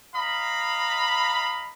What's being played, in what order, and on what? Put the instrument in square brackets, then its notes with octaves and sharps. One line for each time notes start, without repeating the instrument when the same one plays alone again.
[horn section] D#5 F5 A#5 B5